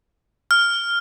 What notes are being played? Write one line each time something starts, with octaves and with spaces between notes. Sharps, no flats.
F6